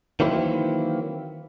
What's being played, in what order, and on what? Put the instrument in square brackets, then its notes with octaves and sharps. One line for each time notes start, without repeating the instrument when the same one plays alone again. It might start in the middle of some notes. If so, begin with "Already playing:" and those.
[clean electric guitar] D#3 E3 F#3 A#3 C4 E4